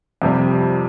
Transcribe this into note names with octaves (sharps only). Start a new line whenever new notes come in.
F2 C3 G3